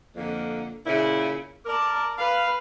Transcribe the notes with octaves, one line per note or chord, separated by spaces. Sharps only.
F2 D3 A#3
A#2 C#3 E4
A#4 D5 A5
B4 F5